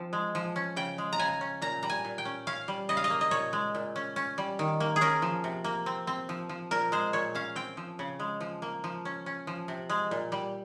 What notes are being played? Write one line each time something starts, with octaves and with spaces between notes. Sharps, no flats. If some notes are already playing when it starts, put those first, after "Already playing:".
Already playing: F3 C4
G#3
F3
C#4
C#3 G5
G#3
A#5
C#3 G#5
C#4
A#2 A#5
G3 A#5
G#5
A#2
G5
C#4
C#4 F5
G3
C#3 D#5
F5
D#5
A#3
D#5
A#2 C#5
G#3
A#2
C#4
C#4
G3
D#3
A#3
G#4
C#4 A#4
F3
C3
A#3
C4
C4
F3
F3
A#2 A#4
G#3 C5
A#2 C#5
C#4 F5
C4 G5
F3
C#3
G#3
F3
A#3
F3
C#4
C#4
F3
C3
G#3
A#2
G3